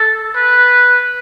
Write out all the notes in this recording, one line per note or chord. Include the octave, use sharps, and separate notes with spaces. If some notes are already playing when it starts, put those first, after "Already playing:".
Already playing: A4
B4